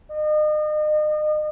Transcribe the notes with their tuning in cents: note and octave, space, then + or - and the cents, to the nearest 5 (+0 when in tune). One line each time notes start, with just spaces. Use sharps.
D#5 -35